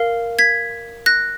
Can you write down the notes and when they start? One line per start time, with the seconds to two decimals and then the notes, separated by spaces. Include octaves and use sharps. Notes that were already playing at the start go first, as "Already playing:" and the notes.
Already playing: A#4 F5
0.39 G#6 B6
1.06 F#6 A#6